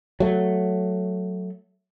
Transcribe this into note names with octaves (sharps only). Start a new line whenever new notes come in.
F#3 A3